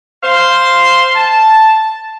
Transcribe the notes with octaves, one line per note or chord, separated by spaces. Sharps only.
C5 F5 C6
A5